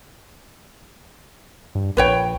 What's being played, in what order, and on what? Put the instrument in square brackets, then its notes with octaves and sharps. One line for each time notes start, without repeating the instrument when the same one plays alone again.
[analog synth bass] G2
[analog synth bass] A#1 [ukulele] B4 C#5 G5